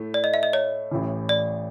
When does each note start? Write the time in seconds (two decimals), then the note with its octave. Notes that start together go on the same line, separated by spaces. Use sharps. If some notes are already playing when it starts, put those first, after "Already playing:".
Already playing: A2 A3
0.14 D5
0.24 D#5
0.34 E5
0.43 D#5
0.53 C#5
0.91 A1 A2 E3
1.29 D5